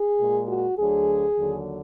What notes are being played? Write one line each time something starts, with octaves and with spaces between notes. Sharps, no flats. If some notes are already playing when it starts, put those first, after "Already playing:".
Already playing: G#4
A#2 G#3
F#4
D2 D3 F#3 G#4
D#2 D3 F#3